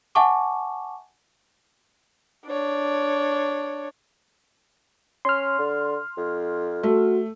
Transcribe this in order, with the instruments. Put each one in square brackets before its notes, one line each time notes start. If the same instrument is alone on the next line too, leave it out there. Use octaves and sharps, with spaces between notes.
[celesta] E5 F#5 G#5 A5 C#6 D6
[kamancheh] D4 C#5
[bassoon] C#4 [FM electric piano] C6 F6
[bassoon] D3
F2
[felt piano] A3 [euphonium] F#4